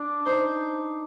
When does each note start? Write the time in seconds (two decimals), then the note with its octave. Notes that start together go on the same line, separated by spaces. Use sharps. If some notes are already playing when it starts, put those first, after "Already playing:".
Already playing: D4
0.26 D#4 C5